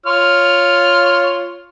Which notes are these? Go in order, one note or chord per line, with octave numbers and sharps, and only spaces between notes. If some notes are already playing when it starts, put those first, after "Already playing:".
F4 C#5 F6